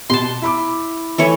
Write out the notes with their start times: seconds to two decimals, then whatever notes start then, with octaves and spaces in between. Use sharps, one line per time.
0.10 B2 G4 A5 C6
0.42 E4 B5 D6
1.18 E3 A3 C#5